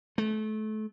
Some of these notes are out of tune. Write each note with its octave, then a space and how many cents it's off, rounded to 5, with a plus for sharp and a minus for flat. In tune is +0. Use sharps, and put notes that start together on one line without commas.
A3 -30